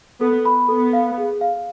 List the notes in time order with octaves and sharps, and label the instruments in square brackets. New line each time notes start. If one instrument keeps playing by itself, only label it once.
[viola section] B3 [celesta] A4
[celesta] B5
[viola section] B3 [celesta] A4
[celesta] F5
G#4
F5